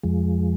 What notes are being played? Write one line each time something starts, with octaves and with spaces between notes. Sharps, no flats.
F2 F3 G#3